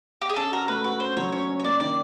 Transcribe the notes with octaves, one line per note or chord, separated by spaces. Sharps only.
G4
G#4
C#4 A4
F#4 A#4
A3 B4
F#4 B4
C#4 C5
F#3 C#5
C#4 C#5
C#4
C#5
A#3 D5
D#3 D5